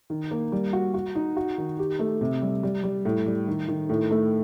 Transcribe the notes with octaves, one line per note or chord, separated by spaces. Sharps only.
D#3
A#3
G3
F#4
F#4
D#4
F#4
D#3
G4
A3
C3
G3
G3
G3
A2
G3
D#3
D#3
A2
A3